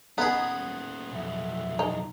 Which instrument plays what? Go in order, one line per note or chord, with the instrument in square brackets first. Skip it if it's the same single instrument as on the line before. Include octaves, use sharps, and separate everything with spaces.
[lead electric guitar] A#2 C#4 [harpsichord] B3 G#4 [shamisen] D#4
[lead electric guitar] B1 F2 [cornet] E5
[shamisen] D#4